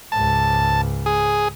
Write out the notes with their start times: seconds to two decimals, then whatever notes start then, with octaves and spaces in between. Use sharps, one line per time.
0.12 C#2 G#2 A5
1.06 G#4